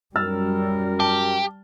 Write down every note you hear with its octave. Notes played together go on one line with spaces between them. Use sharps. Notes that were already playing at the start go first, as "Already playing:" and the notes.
F#2 G3 A#4 E6 F6 A6
G4 A5